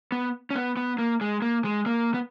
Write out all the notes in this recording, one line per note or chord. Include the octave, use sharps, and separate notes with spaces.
B3
C#4
B3
B3
A#3
G#3
A#3
G#3
A#3
B3